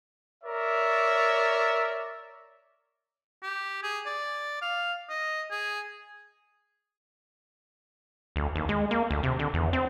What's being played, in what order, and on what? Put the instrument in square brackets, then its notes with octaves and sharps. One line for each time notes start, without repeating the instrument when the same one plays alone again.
[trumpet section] A#4 C#5 D5 E5
[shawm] G4
G#4
D5
F5
D#5
G#4
[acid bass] D2
D#2
G#3
A#3
D2
C3
D3
E2
C4